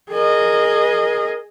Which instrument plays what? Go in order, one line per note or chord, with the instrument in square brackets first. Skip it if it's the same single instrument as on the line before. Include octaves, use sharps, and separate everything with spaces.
[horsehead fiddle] G#4 D#5 [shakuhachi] A#4